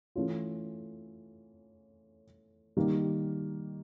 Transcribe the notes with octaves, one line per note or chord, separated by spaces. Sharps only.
E3 A3 C#4 F4
D#3 G3 A#3